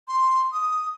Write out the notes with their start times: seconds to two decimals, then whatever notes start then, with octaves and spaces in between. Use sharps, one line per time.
0.08 C6
0.52 D#6